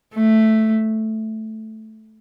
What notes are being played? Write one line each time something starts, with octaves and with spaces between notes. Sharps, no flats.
A3